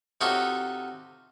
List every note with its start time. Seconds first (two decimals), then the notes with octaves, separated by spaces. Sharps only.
0.21 C3 D#4 F4 F#4 A4 C#5